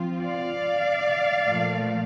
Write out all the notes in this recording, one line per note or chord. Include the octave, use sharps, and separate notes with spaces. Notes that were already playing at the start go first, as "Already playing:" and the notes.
Already playing: F3 C4 F4
D5 F5
A#2 F3 A3